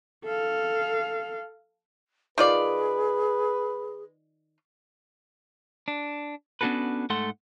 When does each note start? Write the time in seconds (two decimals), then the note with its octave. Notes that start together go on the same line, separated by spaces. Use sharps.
0.25 A4 F5
2.38 D#3 F4 G#4 B4 D5
5.88 D4
6.61 B3 C#4 D4 F#4 A4 B4
7.10 G#2 A3 A4 F#5 C6